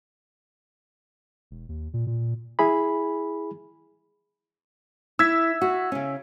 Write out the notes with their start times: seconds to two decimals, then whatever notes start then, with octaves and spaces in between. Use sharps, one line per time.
1.51 E1
1.69 D#2
1.93 A#2
2.07 A#2
2.59 E4 G#4 B5
5.19 E4 E6 G#6 B6
5.61 F#4
5.92 C#3 C#4